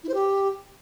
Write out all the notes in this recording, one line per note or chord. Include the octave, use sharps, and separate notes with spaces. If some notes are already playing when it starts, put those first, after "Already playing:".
E4
C5
G4